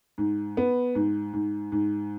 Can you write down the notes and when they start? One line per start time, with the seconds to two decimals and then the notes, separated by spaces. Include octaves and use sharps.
0.18 G#2
0.57 B3
0.95 G#2
1.33 G#2
1.72 G#2